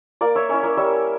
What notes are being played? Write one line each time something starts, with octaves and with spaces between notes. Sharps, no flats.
A#3 A#4 D5
C#5 E5
C#4 E4 C#5 E5
A#4 D5
G3 C#5 E5